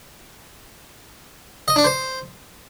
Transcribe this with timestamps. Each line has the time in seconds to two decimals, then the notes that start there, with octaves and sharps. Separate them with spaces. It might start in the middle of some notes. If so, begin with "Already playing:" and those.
1.68 D#5
1.76 D4
1.84 C5